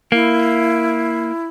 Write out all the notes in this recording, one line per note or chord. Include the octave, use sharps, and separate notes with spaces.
A#3 E4